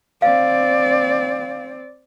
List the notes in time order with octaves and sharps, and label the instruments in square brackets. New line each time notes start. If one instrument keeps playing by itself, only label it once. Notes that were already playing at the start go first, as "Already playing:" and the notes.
[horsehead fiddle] C4 D5 [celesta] F5